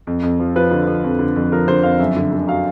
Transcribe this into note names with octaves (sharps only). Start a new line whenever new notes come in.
F2
F2
F3
F3 B4
D3
F3
F2
D3
F2
F3 A#4
D3 C5
F2 F5
F#2 E5
D3
D3
F#3 F5